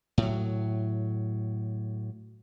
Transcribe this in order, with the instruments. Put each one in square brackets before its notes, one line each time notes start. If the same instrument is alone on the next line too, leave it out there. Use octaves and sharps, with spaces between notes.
[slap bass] A2 F#3